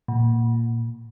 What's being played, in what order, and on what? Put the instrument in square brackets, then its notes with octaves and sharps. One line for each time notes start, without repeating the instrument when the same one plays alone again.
[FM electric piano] A#2